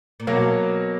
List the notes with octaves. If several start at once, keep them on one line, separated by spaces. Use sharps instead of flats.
A#2
B2 F#3 A#3